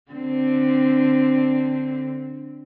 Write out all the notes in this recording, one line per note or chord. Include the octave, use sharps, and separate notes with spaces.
D3 C4